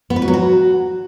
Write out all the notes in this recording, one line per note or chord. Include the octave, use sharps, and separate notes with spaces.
B3
B4
F#4
F#3
F#4